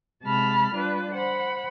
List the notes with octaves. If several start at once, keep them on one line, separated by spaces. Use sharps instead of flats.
C3 G#3 A5 B5 F6
G3 D4 F4 B4
C5 F#5 B5